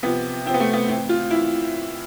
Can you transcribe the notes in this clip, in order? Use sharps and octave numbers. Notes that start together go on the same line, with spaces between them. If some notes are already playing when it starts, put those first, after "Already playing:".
C3 F3 B3
C3 F3 C4
B3
A3
B3
A2 E3 C4
F4
A2 E3 E4